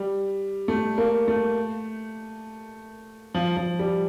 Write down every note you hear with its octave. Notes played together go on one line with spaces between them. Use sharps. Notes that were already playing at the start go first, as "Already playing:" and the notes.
Already playing: G3
A3
A#3
A3
F3
F3
G3